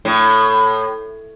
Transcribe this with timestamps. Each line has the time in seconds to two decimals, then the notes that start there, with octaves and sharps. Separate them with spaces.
0.05 A2